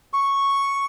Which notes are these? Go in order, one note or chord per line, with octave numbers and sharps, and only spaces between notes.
C#6